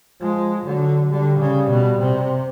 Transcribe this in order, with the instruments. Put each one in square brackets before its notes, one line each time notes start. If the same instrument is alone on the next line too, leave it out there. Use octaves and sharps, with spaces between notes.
[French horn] F3 [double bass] G#3
[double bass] D3 [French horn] F#3
[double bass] D3 [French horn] G3
[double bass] C#3
B2
C3